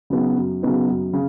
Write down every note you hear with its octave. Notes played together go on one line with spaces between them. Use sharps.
C#3 F#3 B3 D#4
F#2
C#3 F#3 B3 D#4
F#2
C#3